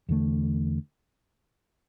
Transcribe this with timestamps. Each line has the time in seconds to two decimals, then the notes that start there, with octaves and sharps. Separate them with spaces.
0.09 E2 D3 A3